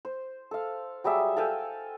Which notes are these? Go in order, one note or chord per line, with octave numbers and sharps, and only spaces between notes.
C5
A4 F5
F#3 G3 G#4 E5
A4 F5 G5 G#5